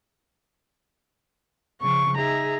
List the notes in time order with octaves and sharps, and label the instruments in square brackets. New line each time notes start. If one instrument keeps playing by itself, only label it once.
[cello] C#3 F3 [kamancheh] C#6
[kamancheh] D#4 A#5 [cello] G#4 E5